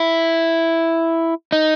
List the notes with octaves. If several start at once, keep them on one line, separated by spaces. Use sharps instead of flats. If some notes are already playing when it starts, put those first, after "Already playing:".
Already playing: E4
D#4